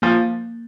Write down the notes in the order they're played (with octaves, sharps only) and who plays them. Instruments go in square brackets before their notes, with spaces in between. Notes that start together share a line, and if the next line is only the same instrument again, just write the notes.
[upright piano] F3 [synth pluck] A#3